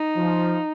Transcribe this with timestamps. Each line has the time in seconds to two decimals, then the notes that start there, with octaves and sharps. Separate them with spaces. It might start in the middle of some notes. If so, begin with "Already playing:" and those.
Already playing: D#4
0.17 F3